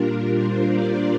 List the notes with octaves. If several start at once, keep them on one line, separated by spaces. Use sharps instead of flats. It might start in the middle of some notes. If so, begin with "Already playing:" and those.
Already playing: A#2 G3 D4 F4 A#4
C5
D5